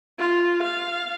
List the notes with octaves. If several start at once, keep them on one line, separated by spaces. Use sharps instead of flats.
F4
F5